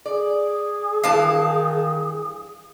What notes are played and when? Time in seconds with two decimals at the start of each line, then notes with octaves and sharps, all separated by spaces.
0.06 G#4 D5
1.04 G2 D#3 E3 F#4 F5 A5